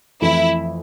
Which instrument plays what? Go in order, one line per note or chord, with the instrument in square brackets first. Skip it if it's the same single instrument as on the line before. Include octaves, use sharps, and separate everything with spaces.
[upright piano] F2 E3 A3 [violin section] E4